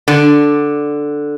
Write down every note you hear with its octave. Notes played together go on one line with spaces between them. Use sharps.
D3